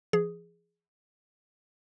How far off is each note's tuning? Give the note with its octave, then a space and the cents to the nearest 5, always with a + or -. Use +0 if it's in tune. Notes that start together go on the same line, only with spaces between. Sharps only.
F3 -35 G#4 +0